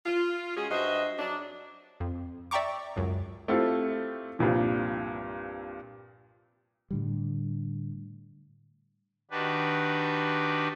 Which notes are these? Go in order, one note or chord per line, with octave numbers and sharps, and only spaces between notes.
F4
G#3 C#4 F#4 G#4
G2 F#4 C5 D#5 E5
F#3 D4
F2
D5 E5 G5 A#5 C#6 D6
C#2 F#2
A3 C4 E4 F4 G4 A4
C2 G2 A#2 F3
A2 D3 G3
D#3 D4 F#4 G4 B4